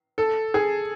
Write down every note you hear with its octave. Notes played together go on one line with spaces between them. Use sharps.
A4
G#4